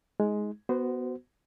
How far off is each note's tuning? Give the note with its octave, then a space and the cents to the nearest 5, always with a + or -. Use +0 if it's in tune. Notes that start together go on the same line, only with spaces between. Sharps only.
G#3 +10 D#4 +25
B3 +0 F#4 +10 C5 -20